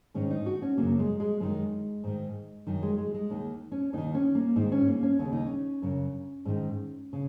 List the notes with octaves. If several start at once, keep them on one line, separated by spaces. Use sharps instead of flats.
G#2 D#3 C#4
D#4
F#4
C#4
F#2 C#3 A#3
G#3
G#3
F#2 D#3 G#3
G#2 D#3
F#2 D#3
G#3
G#3
G#3
D#2 D#3
C#4
D#2 D#3 D#4
C#4
A#3
G#2 D#3 D#4
C#4
A#3
C#4
D#2 C#3 C#4
D#4
C#4
F#2 C#3
G#2 D#3
C#3